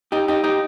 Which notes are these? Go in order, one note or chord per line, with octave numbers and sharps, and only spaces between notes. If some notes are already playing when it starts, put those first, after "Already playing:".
D#4 G4
D#4 G4
D#4 G4